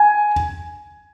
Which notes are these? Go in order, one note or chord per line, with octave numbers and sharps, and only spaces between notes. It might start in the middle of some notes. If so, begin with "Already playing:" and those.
Already playing: G#5